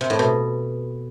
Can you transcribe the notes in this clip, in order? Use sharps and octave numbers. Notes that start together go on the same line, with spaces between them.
C3
A2
B2